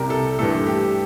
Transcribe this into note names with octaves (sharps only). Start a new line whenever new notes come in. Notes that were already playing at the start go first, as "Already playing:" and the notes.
Already playing: C2 C3 G3 A#4
A4
G2 E3 A3 A4
G4